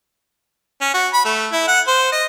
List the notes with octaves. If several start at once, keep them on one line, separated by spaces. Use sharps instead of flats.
C#4
F#4
B5
A3
E4
F#5
C5
D#5